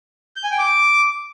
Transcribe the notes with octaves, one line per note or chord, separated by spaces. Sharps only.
G6
G#5
G5
D6